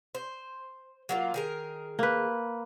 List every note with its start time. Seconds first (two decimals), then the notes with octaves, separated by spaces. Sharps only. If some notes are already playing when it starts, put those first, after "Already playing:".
0.15 C5
1.09 F#3 A#3 F4
1.34 D#3 G#4 A#4
1.99 A#3 B4